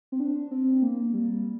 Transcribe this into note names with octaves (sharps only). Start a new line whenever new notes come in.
C4
D4
C4
A#3
G3